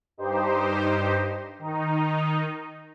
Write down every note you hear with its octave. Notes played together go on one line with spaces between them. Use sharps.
G2 D#4 G4 C5
D#3 D#4